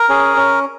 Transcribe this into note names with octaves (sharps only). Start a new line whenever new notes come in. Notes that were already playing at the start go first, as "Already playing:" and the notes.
Already playing: A#4
C#4 G#4
C#4